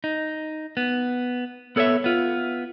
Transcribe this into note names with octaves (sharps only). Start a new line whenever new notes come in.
D#4
B3
B3 A4 C#5 D5 E5
B3 F4